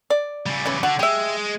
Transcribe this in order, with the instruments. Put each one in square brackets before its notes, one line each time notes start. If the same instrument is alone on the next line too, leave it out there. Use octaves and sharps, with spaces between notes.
[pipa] D5
[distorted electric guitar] C#3 G3
[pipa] E3 C#4
[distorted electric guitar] D3 [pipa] F#4
[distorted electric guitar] G#3 [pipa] G4 E5